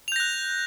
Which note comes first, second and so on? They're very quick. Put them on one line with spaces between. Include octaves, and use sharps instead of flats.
F7 G6 A#6 F#6